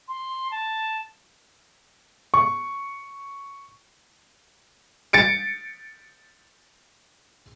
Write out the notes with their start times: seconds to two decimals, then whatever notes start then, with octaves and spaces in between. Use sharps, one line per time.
0.08 C6
0.51 A5
2.34 C#6
5.13 A6 C#7 D7